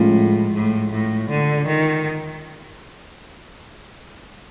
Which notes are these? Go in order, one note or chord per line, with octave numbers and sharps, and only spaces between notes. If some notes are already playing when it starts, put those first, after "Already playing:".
Already playing: A2 F3 G#3 C#4 F4
A2
A2
D3
D#3